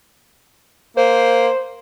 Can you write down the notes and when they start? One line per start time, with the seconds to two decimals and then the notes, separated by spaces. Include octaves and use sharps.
0.97 A#3 C5